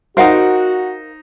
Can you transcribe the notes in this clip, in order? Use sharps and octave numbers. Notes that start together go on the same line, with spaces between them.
D#4 F#4 A#4 C5 F5 F#5